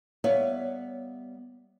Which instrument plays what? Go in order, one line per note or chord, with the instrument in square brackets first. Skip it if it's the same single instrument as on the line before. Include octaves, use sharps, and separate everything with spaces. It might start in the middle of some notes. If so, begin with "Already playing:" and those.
[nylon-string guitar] G3 B3 C#5 E5 F5